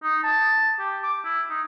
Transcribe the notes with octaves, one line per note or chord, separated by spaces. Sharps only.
D#4
A5
G4
D6
E4
D#4